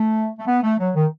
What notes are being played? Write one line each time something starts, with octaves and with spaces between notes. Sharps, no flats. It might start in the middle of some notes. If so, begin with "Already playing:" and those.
Already playing: A3
A3
B3
A3
F#3
D#3